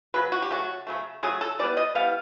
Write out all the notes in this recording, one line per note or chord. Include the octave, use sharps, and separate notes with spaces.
C#3 F#3 B4
F#4
G4
C#3 F#3 A3 F#4
C#3 F#3 A3
C#3 F#3 A3 G#4
A4
E3 G3 B3 D5
D#5
E3 G3 B3 F5